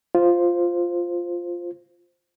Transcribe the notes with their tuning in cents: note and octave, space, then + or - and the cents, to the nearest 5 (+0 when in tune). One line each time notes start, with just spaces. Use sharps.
F4 +0 C5 +0